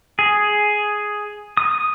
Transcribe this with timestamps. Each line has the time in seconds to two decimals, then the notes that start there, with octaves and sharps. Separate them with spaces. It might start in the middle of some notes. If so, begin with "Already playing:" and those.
0.19 G#4
1.57 D#6